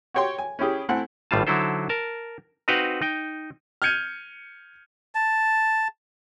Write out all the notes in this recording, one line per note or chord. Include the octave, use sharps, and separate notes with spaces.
F#4 G4 C#5 G5 C6
G#5
C#4 E4 G4 G#4
A3 C4 E4 F#5 G#5
G#1 A2 G3 F4 A5
D3 F#3 D#4 E4 A4 C5
A#4 A5
C4 D#4 F#4 B4 F5 G5
D#4 G5
F6 G6 G#6 C#7 D#7
A5